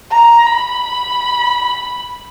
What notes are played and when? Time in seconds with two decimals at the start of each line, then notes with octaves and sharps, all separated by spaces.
0.12 A#5
0.46 B5